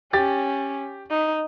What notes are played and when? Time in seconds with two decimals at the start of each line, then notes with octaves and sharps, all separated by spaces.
0.13 C#4 G4 A6
1.10 D#4